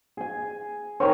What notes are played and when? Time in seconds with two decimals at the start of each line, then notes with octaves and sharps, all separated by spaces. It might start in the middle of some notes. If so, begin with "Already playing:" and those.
0.17 G#4 G#5
1.00 D#3 C4 A#4 C#5